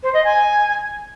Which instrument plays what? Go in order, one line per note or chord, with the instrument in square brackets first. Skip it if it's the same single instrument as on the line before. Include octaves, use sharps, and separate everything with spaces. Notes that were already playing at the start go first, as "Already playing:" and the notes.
[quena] C5
D#5
G#5